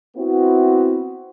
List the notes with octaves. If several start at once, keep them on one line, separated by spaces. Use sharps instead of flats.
B3 C4 E4 F#4